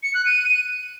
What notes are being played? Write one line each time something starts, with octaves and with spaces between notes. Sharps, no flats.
C#7
F#6
D#7